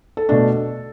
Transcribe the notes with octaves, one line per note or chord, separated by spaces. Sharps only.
A4
B2 A3 D4